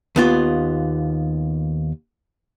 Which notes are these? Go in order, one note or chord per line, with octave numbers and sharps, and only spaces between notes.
D#2 B3 F4